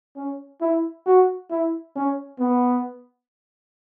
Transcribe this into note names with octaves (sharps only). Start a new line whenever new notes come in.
C#4
E4
F#4
E4
C#4
B3